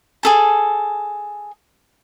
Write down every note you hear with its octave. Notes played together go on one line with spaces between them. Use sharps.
G#4 A4 A5